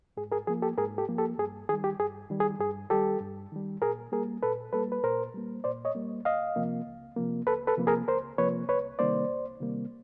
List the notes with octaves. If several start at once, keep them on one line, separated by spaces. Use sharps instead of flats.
G#2 G#4
G#4 A#4
F3 A#3 G#4
G4 A4
G#2 G#4 A#4
G4 A4
F3 A#3
G4 A4
G2 G#4
D#3 G3 G#4
G4
G2 G#4
D#3 G3
G#4
G2 G#4
D#3 G3 G4 A4
G2
D#3 G3
A#2 G#4 A#4
G3 A#3 G#4 A#4
A#2 A4 B4
G3 A#3 A4 B4
B4
A#2 A#4 C5
G3 A#3
A#2 C5 D5
C#5 D#5
G3 A#3
C#2 D#5 F5
C3 F3 A#3
C#2
C3 F3 A#3
C#2 A4 B4
A4 B4
C3 F3 A#3
G#4 A#4
C#2 A#4 C5
C3 F3 A#3 B4 C#5
C2 B4 C#5
C3 D#3 G3 A#3 C5 D5
C2
C3 D#3 G3 A#3